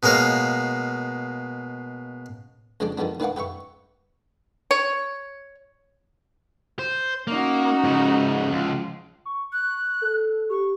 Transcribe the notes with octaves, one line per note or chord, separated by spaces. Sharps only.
B2 G#3 A#3 C#5 F5
C#2 F3 G#3 D4 G#5 D6
D#3 F3 G#3 B3 D4
D#3 D4 B4 F5 F#5 D6
G4 B4 E5 C#6
C#5
C5
A#3 C#4 D#4 F#4
G#2 C#3
C#2 F3
C#6
F#6
A4
G4 C#6